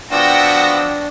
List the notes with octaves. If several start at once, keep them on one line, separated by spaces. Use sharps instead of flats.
F3 B3 D4 F#4 G5 E6 A#6